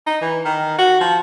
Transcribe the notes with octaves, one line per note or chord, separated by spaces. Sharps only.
D#4
E3
D#3
F#4
F3